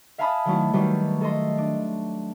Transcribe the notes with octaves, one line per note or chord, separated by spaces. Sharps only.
E5 F5 G#5 A5 B5 D#6
D#3 F#3 A3 E4
D#3 F#3 G3 A3 B4
A4 D#5 C6
D4